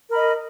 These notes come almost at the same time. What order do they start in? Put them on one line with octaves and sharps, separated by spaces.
A#4 B5 D#5